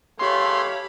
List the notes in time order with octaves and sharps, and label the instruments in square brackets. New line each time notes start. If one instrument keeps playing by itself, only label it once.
[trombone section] C#2 A3 [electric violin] G4 B5 [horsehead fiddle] C#5 F5 [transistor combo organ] C6